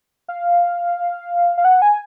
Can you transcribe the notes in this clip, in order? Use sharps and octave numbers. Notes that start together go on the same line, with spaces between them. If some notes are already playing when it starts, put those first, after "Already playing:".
F5
F5
F#5
G#5